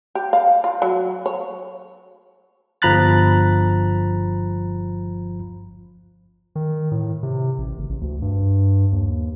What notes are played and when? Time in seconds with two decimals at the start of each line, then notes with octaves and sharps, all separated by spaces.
0.15 G4
0.33 F5
0.64 F4
0.82 F#3
1.26 C#5
2.82 G1 F3 A#5 B5 F#6 A6
6.56 D#3
6.92 A2
7.23 C3
7.58 A1
7.78 F#1
7.89 A1
8.01 D2
8.22 G2
8.92 D#2